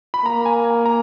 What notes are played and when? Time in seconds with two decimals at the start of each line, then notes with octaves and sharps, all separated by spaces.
0.14 B5
0.25 A#3 A#5
0.46 G#5
0.65 G#5
0.86 A#5